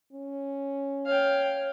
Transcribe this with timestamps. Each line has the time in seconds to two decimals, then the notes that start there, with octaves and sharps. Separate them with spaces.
0.13 C#4
1.07 C#5 F5 G5